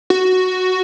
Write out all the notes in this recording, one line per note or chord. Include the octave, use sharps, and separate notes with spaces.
F#4